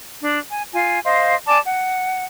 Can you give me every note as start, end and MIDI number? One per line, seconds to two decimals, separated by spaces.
0.22 0.39 62
0.50 0.64 80
0.73 1.00 65
0.73 1.00 80
1.05 1.34 72
1.05 1.34 75
1.05 1.34 77
1.05 1.34 84
1.47 1.58 74
1.47 1.58 80
1.47 1.58 81
1.47 1.58 86
1.65 2.24 78